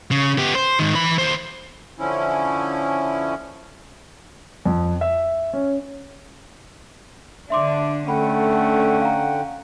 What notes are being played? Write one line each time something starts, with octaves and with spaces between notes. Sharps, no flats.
C#3
B3 G4
C5
G#2 D#3
E3 B5
D#2 C5
D3 F3 C#4 E4
F2
E5
C#4
D3 D4 E5 C6 D6
D3 A3 C#4 F#5 G5 B5
F5 A#5